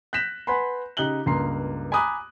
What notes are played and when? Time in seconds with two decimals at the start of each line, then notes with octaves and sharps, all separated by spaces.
0.13 F#6 G6 A#6 B6 E7
0.47 B4 F#5 G#5 B5 C6
0.97 C#3 D#4 G4 F#6 F#7 G7
1.26 C#2 G2 A#3 A#5 C6 C7
1.92 G#5 A#5 B5 D6 D#6 F#6